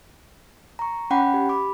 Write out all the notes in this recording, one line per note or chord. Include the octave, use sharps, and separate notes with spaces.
A#5 C#6
C#4 F#5 G5 B5
G4
B5 D6